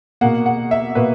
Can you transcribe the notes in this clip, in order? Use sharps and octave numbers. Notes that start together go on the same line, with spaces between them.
B2 A#3 F#5
F#5
E5
B2 A#3 B4